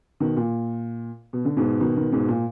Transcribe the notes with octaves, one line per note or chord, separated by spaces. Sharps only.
B2 D#3
A#2
B2
D3
G#2 B2
B2 D#3
B2 D#3
G#2 B2
A#2